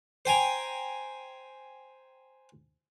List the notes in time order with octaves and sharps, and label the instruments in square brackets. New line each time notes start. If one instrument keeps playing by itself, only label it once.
[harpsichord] C5 G5 G#5 A#5